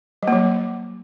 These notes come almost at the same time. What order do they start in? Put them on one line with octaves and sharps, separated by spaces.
G3 A#3 F#3